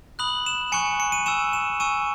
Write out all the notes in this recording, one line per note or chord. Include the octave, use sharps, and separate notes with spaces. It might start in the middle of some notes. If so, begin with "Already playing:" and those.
B5 D#6 F#6 F#7
E7
G#5 C#6 F#6 C#7
C#7
D#7
G#5 C#6 E6 E7
E7
G#5 C#6 E6 D#7